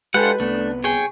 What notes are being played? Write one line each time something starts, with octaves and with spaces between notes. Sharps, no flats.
G#3 D4 F4 G4 A4 B4 F#5
C2 A3 B3 D4
G#4 C#5 G5